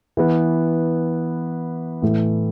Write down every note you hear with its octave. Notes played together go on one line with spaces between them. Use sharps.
E3 B3 E4
A2 E3 A3